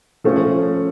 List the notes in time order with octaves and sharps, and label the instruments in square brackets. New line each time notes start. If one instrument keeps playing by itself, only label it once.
[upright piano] F3 A3 C#4